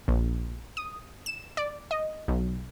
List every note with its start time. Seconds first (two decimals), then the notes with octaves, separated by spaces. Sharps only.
0.08 A#1
0.77 D#6
1.26 E7
1.57 D5
1.91 D#5
2.28 B1